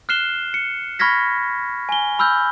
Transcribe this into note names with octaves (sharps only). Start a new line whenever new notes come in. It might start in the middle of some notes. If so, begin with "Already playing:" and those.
F6 F#6 C7 E7 G7
C#7
B5 C#6 F6 G#6 A#6 B6
G#5 G7
B5 E6 F6 G6